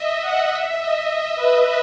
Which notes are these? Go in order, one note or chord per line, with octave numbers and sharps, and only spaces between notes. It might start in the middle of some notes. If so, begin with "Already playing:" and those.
Already playing: D#5 E5
F#5
E5
D#5
B4